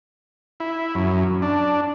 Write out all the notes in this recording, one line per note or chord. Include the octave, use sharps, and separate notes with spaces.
E4
F#2
D4